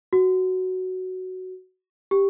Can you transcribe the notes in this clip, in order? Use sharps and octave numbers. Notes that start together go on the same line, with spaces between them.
F#4
G4